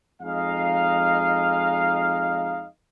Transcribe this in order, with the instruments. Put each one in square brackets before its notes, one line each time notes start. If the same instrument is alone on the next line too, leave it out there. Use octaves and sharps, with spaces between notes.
[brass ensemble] F2 G#3 D#4 D#5 F5